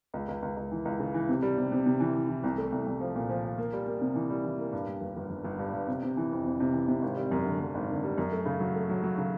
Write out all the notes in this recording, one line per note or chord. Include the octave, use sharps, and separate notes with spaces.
C#2
C#2
C#2
C#2
E3
C#2
C#3
E3
C3
G3
C3
C3
C3
E3
E3
E3
C2
A3
C2
C2
F3
A#2
F3
F3
A#3
G3
A#3
C3
E3
G3
E3
A#3
G2
G2
G1
G1
G1
G1
G2
G2
C3
C3
E3
F2
F2
C3
E3
C3
G#1
G3
F#2
D3
F#2
G#1
D3
G3
F#2
A3
C#3
F#3
A3
F#3
F#3
C#3